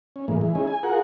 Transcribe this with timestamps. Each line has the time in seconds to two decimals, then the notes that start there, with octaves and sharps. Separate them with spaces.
0.16 C#4
0.28 A2 E3 G#3 A#3
0.41 E3 G#3
0.55 C#4 D#4 E4 G#4
0.67 G#5
0.83 F4 G#4 A#4 F#5